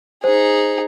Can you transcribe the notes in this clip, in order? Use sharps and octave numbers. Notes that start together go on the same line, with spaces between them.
D#4 G#4 C5